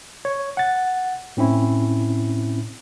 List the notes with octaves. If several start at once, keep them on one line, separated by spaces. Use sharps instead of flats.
C#5
F#5 A6
A2 C4 C#4 E4